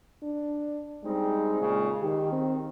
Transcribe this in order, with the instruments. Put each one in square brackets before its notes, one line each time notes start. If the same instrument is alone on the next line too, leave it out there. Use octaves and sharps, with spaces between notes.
[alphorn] D4
[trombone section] G3 C4 D#4 [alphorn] G#3
[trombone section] A#2 C#3
[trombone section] D#3 [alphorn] G4
[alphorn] C4